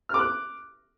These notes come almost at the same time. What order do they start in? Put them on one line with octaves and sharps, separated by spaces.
F6 D6 F#6